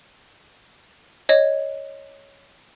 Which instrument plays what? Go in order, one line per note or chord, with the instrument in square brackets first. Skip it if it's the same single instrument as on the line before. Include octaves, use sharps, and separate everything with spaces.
[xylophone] C#5 D#5